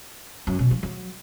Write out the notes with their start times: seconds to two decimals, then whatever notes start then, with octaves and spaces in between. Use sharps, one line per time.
0.47 F#2
0.59 B2
0.71 F3
0.83 F#3